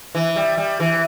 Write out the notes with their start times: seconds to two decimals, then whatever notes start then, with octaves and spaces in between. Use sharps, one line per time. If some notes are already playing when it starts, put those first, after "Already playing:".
0.15 E3
0.36 G3
0.57 G3
0.80 E3